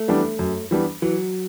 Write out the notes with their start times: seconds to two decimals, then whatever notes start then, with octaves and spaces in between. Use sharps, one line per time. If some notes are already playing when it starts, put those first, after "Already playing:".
Already playing: A3
0.08 E3 G3 B3 D4
0.39 F#2
0.71 E3 G3 B3 D4
1.02 E3 F#3